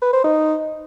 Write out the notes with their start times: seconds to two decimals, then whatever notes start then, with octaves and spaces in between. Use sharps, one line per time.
0.02 B4
0.13 C5
0.24 D#4